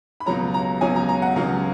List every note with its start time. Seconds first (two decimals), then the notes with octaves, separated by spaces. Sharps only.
0.20 B5
0.26 C#2 B2 F#3 C#4 A#5
0.54 A#5
0.81 C#2 B2 F#3 C#4 G#5
0.96 A#5
1.09 A#5
1.22 F#5
1.36 C#2 B2 F#3 C#4 F5